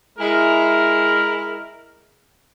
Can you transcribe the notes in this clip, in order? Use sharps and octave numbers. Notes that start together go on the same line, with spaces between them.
G#3 E4 A#4